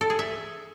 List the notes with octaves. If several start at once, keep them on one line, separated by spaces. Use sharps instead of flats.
A4
G#4
E5